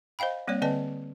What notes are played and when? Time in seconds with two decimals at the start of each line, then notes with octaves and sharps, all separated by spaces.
0.19 C5 D#5 F5 G5 B5
0.48 G3 A#3 C4 C#5 D5
0.62 D3 C4 B4 D5 D#5 A5